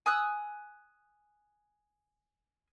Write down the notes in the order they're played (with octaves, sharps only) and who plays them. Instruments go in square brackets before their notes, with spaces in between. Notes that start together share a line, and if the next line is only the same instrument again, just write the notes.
[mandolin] G#5 D#6 E6 F#6